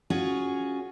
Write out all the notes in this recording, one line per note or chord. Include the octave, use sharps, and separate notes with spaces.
C#4 F4 F#4 G#4